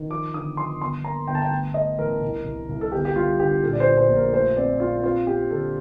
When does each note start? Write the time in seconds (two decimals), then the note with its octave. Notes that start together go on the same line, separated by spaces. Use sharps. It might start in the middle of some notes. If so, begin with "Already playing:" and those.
Already playing: D#3
0.10 F3 D6
0.34 D3 D#6
0.57 F3 C6
0.81 G1 C6
1.04 A#3 A#5
1.28 G1 G5
1.35 A5
1.42 G5
1.51 A3
1.74 A3 D#5
1.99 A1 A#4
2.22 C2
2.45 C2
2.69 C2
2.81 A4
2.92 G1 G4
3.05 G4
3.16 G3 F4
3.39 D3 G4
3.63 A#2 A4
3.73 D5
3.80 C5
3.87 A#2
3.97 C5
4.09 A#1
4.16 A#4
4.33 A3 C5
4.56 C4 D5
4.80 C4 F4
5.03 C4 F4
5.27 C4 G4
5.51 D3 A4